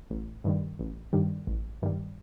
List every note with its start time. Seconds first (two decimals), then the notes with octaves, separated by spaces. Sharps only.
0.10 A1
0.44 G2 D#3 G3
0.79 A1
1.13 G2 D#3 G3
1.47 A1
1.82 G2 D#3 G3